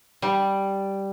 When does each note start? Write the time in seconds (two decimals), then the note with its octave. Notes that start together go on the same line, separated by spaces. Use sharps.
0.22 G3